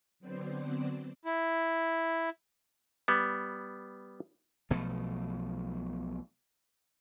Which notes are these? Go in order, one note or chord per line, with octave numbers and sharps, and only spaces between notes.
D3 F#3 B3 C4 C5 D5
E4
G3 B3
B1 B2 F3 A3